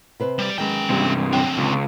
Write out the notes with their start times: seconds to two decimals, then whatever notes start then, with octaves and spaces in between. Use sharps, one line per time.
0.20 C3 B4 C5
0.38 G3 D5
0.58 D#3 G#3 B3 C#4 G5
0.90 G2 C3
1.33 D3 F#3 C4 G5
1.58 C#2